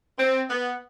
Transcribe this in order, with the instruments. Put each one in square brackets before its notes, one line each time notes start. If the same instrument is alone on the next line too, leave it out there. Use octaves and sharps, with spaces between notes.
[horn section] C4
B3